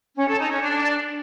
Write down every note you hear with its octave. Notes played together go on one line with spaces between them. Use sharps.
C#4
A4
D#4
C#4
D4